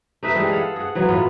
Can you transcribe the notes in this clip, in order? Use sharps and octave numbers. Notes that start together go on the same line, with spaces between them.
A3 D#4 B4 E5
E3 G3 G#3
G#4 A4 F5 F#5
G#4 F#5
E3 F#3 B3
A2 B3 F4